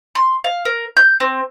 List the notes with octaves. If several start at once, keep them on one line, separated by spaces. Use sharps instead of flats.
C6
F5
A#4
G6
C4